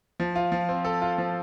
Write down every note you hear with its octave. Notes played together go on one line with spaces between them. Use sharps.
F3
F4
F3
C4
A4
F4
F3